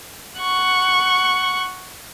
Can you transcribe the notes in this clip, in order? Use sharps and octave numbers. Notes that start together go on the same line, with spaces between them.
F#5 C#6